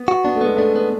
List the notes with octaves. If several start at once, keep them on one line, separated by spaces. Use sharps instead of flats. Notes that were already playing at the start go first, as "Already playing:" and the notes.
Already playing: B3
F#4
B3 D4
A3
G#3 B3
A3 D4
B3